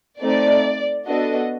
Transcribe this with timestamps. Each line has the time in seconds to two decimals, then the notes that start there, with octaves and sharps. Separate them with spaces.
0.21 A3 C4 D#4 D5
1.07 B3 D4 F#4 A4 D#5